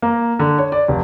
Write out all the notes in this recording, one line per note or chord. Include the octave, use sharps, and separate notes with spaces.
A#3
D3
C#5
D5
F1